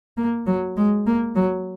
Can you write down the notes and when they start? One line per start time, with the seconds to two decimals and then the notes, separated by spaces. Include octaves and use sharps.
0.17 A#3
0.46 F#3
0.77 G#3
1.06 A#3
1.35 F#3